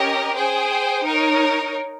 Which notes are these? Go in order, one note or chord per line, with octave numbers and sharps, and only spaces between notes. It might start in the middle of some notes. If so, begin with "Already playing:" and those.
Already playing: C#4 G4 A#4 D#5
G#4 C5 G5
D#4 A#4 C#5